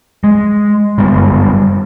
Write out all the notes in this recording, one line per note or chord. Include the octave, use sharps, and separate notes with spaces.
G#3
G1 F#2 G3 B3